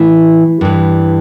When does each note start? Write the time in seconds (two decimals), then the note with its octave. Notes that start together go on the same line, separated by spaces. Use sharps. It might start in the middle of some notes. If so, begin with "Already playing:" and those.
Already playing: A2 E3 E4
0.61 G2 E3